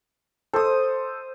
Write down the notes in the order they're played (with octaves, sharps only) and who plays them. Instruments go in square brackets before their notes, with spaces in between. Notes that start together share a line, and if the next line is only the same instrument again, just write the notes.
[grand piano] A4 [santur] C5 D#6